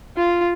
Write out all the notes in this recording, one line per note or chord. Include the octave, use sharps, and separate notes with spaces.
F4